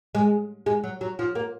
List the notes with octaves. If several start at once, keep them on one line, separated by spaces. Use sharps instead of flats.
G#3
G#3
F#3
F#3
F3
A#3